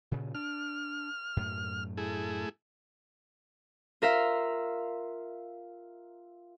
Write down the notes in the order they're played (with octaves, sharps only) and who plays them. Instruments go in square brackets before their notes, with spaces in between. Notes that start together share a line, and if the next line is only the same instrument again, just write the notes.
[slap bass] A#2 C#3
[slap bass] D4 [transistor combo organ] F6
[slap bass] F#2 A2
[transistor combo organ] A3 E4 G#4
[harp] F4 A#4 E5 F5